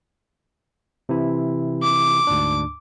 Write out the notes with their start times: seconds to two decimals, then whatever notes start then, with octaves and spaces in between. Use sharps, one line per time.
1.09 C3 E3 E4
1.83 D6
2.27 D2 G#2 D4